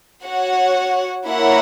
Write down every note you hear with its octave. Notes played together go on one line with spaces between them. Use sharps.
F#4 C#5 F#5
A#3 E4 A#4 C#5 F#5